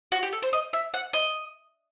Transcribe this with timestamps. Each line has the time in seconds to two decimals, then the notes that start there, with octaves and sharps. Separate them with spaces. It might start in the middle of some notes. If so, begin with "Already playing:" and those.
0.12 F#4
0.23 G4
0.33 A4
0.42 C5
0.53 D#5
0.73 E5
0.94 F#5
1.13 D#5